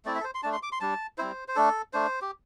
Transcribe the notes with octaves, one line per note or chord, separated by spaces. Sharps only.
A3 C4 E4 D5
E5
A4
C5
C6
A3 D4 A5
C6
D6
C6
G3 D4 A5
G3 C4 E4 C5
C5
A3 D4 A4
A3 D4 C5
G4